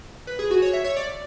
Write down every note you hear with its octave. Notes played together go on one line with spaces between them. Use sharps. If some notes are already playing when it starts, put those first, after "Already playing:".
B4
G#4
F#4
C#5
E5
C#5
D5